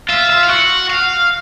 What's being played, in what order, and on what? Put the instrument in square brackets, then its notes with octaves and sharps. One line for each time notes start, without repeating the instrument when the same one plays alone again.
[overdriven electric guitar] F4 [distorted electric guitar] E5
[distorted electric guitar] E5
F5
[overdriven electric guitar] F#4 [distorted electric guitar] F#5
[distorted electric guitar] F5